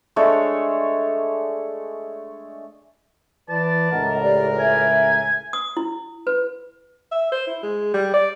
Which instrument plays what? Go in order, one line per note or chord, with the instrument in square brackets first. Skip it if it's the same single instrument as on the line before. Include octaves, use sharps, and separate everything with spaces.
[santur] G#3 A3 D4 C#5
[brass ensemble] E3 B4 D5 [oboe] A5
[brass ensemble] C#2 A2 A#4 [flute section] D#5 F#5
[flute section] G4 B4 D5
[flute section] E5 [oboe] G#5
[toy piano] D#6
E4
B4
[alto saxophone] E5
C5
E4
G#3
G3
D5